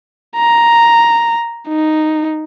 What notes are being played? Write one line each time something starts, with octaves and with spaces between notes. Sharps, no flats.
A#5
D#4